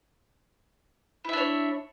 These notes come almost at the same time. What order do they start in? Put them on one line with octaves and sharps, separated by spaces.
E4 E5 D4 C#5